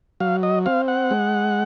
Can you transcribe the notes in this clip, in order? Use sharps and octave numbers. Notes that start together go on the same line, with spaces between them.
F#3 F5
D#5
C4 F5
F#5
G#3